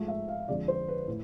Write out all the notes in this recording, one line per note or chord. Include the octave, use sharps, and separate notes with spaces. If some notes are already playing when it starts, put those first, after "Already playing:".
Already playing: G#2 F3 A3
E5
F5
F2 D3 G#3 D5
C5
B4
A2